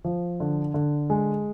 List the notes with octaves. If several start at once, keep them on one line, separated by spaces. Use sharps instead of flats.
F3
D3
D3
G#3